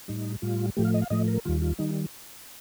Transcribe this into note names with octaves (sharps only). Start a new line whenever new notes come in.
A2 G3 D#4
A2 G3 F4
A2 F3 A3 G4
F5
D#5
F5
A2 F3 A3 D#5
A#4
D#2 D#3 G3 F4
F4
D#3 G3 D#4